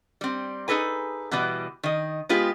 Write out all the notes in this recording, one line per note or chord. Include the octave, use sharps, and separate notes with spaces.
G3 C4
D#4 G#4 A4 B4 G#5
B2 E3 G3 B3
D#3 D#5
G#3 B3 F4 G4